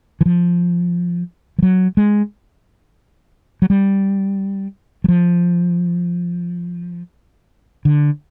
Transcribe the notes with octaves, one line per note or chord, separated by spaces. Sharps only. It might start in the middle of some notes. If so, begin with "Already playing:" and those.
E3
F3
F3
F#3
G#3
F#3
G3
F#3
F3
D3